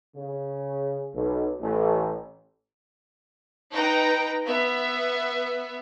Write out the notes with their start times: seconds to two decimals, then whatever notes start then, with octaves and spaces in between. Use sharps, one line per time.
0.15 C#3
1.13 B1
1.60 A1
3.72 D#4 B4 G5 A#5
4.46 B3 E5